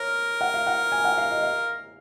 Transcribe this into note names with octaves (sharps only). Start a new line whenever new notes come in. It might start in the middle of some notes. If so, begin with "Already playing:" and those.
Already playing: A#4 C#5
F#5
F5
F#5
G#5
F#5
F5
D#5
F5